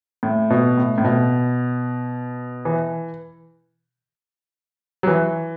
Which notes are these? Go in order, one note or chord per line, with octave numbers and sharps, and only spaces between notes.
A2
B2
A2
A2
B2
E3
F#3
E3